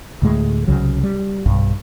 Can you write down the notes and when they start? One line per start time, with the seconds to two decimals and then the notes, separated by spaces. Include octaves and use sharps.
0.22 D2 A2 G#3
0.67 C2 C#3 F#3
1.03 G3
1.46 B1 G2